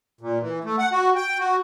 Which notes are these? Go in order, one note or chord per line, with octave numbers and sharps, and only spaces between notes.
A#2
E3
A3
F#5
F#4
G5
F#4